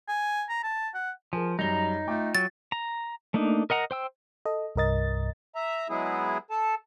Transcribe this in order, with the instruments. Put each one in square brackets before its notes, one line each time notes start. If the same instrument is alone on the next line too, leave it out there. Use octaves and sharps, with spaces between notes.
[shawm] G#5
A#5
A5
F#5
[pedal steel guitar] F3 [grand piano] G#4 A#4 G#5
[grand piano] F#2 G3 G7 [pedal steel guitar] D#4 [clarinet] A#5
[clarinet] A3 [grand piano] F4 G5 D6
[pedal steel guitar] F#3 [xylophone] A6
[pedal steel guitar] A#5
A3 A#3 D4 D#4
A#4 D#5 F#5 A#5
C5 G5 E6
[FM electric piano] A4 D#5
C2 G2 A#4 D#5 A6
[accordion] E5 A#5
F#3 G#3 B3 E4 G#4
A4 A5